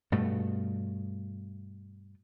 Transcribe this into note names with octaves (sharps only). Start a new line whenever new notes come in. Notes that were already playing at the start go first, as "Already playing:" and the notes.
G2 B2 A3